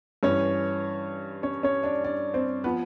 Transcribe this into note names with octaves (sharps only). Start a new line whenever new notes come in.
G2 E3 C#4 C#5
C#4 C#5
C#4 C#5
D4 D5
D4 D5
C4 C5
F3 B3 B4